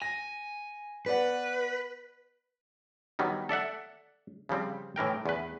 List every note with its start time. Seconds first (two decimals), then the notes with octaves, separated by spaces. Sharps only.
0.02 G#5 A#6
1.06 B3 B4 D5 F#5
3.19 D#3 F#3 G3 B3
3.49 A4 D5 E5 F#5
4.49 C#3 F3 G3 C4
4.96 A2 E3 A#4 G5
5.26 E2 B4